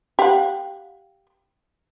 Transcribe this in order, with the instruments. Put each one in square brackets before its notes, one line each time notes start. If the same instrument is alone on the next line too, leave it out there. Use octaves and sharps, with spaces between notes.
[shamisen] G4 F5 F#5